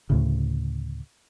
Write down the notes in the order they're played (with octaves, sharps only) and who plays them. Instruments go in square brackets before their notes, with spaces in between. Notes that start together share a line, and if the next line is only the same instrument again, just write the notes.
[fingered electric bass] D2 A2 C#3